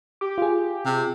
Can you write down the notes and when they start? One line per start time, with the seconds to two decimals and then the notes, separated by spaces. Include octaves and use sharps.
0.21 G4 D6
0.38 F4 G#4
0.86 C3